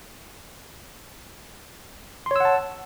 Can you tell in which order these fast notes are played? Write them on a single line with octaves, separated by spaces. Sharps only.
C6 C#5 E6 F#5 A5